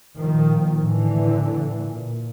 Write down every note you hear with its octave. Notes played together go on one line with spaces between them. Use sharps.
A#2 D#3 F3
A#2
A2 D3 E3
A2
A2
A#2